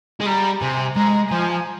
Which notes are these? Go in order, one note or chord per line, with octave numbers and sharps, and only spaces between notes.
G#3
G3 A#5
C3 G#5
G#3 A#5
F3 G#5